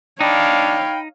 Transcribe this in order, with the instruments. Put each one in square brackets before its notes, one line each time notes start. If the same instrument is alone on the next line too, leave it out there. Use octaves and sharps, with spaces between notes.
[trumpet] D4 [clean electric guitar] D#4 [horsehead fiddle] C#5 F5 [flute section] G5 B5